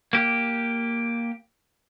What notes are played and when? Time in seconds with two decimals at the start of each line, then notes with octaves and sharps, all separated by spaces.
0.13 A#3 G4